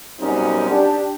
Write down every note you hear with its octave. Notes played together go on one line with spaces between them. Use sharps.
F#2 B2 G3 C4 C#4 D#4
D4 G4